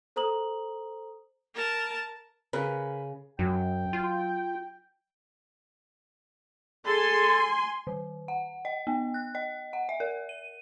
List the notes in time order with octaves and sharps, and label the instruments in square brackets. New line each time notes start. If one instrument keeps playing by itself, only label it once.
[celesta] A4 C5 A#5 D#6 F#7
[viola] A#4 A5
[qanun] C#3 [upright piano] A#4 B4
[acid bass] F#2 [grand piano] F#3 [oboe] G5
[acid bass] F4
[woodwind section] G#4 A4 [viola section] G#5 C6
[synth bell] D#3
F#5
D#5
B3
F#6
D#5
F#5
E5
A#4
D#7